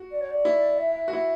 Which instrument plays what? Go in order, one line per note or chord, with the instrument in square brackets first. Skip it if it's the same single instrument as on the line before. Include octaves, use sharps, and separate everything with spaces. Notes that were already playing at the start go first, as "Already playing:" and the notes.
Already playing: [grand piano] F#4
[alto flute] D5
C#5
D5
[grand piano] E4
[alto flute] E5
E5
[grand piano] F#4
[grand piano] E4 [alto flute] E5